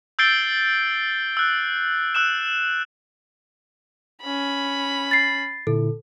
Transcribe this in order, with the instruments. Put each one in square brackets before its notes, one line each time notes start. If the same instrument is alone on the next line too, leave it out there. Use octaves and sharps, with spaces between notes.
[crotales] E6 G6 A6 C7 D7 G7
E6 F#6
E6 F#6 E7
[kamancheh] C#4 B5
[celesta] A6 C7
[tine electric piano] A#2 D3 E4 [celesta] A4